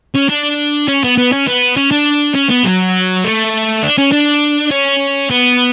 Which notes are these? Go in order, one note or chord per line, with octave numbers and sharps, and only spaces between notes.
C#4
D4
C#4
B3
B3
C#4
B3
C#4
D4
C#4
B3
F#3
A3
D4
C#4
D4
C#4
B3